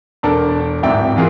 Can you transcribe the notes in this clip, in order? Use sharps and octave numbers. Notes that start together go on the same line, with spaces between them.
E1 D4 A4 A#4
D1 G#2 C3 E4 D5 G5
C3 E3 F4 G#4 A#4